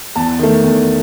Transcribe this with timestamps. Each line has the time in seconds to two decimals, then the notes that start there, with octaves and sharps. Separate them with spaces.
0.16 E2 A5
0.39 D#3 A3
0.64 E2